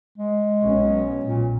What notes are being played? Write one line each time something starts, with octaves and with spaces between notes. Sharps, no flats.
G#3
B1 C#4
A#2